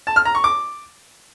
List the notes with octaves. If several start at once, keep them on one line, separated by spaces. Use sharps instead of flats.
A5
F6
A#5
C#6
D6